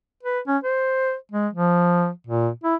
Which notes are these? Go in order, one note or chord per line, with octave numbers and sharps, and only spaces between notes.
B4
C#4
C5
G#3
F3
A#2
E4